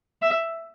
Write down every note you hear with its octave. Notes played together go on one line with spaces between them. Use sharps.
E5